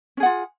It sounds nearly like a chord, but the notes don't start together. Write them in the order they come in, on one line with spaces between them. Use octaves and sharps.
C#4 G#4 F#5 F4